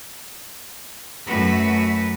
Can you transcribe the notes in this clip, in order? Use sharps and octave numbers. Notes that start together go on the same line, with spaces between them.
F#2 A3 F#4 B4